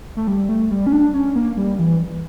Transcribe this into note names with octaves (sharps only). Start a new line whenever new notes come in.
A3
G3
A3
G3
C#4
D4
C#4
A#3
G3
E3